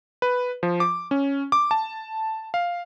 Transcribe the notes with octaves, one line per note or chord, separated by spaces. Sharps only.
B4
F3
D6
C#4
D6
A5
F5